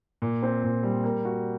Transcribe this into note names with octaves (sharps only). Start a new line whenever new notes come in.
A#2
C4
A#2
G3
A#3
F#4